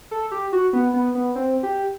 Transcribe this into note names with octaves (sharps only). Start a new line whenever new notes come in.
A4
G4
F#4
B3
B3
B3
C4
G4